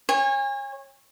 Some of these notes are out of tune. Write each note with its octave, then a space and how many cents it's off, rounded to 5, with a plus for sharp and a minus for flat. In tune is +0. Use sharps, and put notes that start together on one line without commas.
C#5 -20 G#5 -35